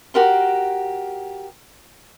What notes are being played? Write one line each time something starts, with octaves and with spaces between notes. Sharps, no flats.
F#4 G4 A#4 C6